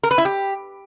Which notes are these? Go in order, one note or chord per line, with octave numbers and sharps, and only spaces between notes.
A#4
B4
E4
G4